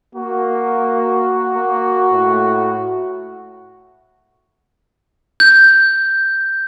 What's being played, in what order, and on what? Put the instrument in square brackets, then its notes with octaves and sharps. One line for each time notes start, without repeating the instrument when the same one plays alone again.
[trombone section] A#3 [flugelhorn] F#4
[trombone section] A#3
A2
[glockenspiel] G6